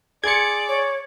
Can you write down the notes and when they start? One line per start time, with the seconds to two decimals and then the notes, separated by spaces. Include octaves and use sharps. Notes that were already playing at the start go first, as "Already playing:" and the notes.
0.24 G#4 D5 C6 G#6 C#7
0.68 C#5